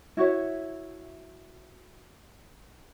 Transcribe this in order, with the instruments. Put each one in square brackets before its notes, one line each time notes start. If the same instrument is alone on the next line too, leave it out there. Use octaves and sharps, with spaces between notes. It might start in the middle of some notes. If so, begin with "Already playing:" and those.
[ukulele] E4 F#4 C#5 E5